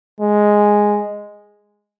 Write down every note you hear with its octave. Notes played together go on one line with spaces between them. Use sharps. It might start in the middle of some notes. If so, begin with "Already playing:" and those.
G#3